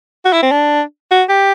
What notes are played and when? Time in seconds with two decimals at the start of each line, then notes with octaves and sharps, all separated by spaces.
0.25 F#4
0.33 E4
0.43 C4
0.51 D4
1.11 F#4
1.29 G4